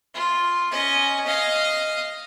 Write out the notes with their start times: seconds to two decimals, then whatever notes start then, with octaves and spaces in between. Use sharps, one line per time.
0.14 F4
0.72 C#4 D#5
1.26 D#5 F5